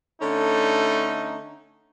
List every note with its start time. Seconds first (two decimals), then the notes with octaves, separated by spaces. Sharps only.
0.22 D3 A3 C#4 D#4